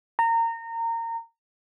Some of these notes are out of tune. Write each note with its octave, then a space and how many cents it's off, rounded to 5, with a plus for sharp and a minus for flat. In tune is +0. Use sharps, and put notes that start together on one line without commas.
A#5 -25